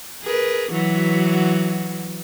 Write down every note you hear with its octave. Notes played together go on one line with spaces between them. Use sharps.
G#4 A#4 B4
E3 F#3 F#4